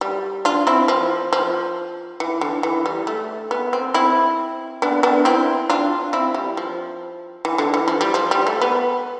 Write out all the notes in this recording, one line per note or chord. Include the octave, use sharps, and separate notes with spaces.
G3
D4 F4
C4 E4
F3
F3
E3
D3
E3
G3
A3
B3
C4
C4 E4
B3 D4
B3 D4
C4 E4
D4 F4
C4 E4
G3
F3
E3
D3
E3
F3
G3
F3
G3
A3
B3